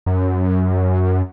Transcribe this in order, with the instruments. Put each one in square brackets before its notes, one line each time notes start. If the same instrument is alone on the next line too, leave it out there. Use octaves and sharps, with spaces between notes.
[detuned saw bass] F#2